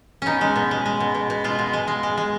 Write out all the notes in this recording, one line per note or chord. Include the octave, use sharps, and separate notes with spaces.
B2 C#4 D#4
G#3
B2
G#3
G#3
B2
B2
B2
G#3 F4
B2
G#3
G#3
G#3
G#3